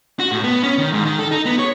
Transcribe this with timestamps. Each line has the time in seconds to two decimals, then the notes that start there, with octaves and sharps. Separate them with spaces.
0.19 F#4
0.32 A2
0.43 B3
0.63 C#4
0.78 D#3
0.93 G#2
1.04 D#3
1.19 A4
1.31 D#4
1.46 B3
1.59 C#5